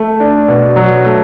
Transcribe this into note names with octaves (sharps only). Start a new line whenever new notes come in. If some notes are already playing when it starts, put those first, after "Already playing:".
Already playing: A3
D4
B2
F#3
A3